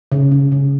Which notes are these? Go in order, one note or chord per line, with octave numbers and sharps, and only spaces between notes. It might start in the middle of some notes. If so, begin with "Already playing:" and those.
C#3
C#3
C#3